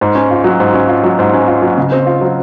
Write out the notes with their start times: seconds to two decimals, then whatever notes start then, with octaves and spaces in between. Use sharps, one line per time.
0.01 G#2
0.15 C#4
0.31 F4
0.44 F#3
0.60 G#2
0.74 C#4
0.88 F4
1.03 F#3
1.19 G#2
1.34 C#4
1.48 F4
1.62 F#3
1.77 C#3
1.92 C4
2.06 F4
2.21 F#3